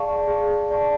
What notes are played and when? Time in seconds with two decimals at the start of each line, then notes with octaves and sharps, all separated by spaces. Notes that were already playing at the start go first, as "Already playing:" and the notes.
Already playing: G#4 D5 F5 A5 C#6
0.27 G#4
0.70 D5 F5 A5 C#6